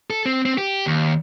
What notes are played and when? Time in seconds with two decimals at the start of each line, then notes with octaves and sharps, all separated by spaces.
0.10 A4
0.26 C4
0.46 C4
0.58 G4
0.86 D#2